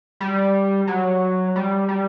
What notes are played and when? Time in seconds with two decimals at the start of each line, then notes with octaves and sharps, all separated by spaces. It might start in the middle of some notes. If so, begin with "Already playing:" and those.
0.20 G3
0.87 F#3
1.56 G3
1.88 G3